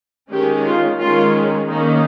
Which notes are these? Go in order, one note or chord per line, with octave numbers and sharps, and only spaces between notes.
D#3 G#3 C#4 G4
F4
D#3 G#3 C#4 F4
D#3 A#3 C#4 D#4